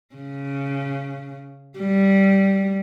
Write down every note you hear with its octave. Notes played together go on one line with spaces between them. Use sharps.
C#3
G3